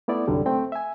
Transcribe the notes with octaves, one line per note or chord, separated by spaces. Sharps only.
A3 B3 E4 D5
C2 G2 D3 F#3 G3
A3 C4 G5
E5 G#5